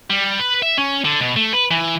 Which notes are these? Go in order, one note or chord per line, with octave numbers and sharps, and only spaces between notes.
G3
B4
E5
C#4
D3
B2
A3
B4
E3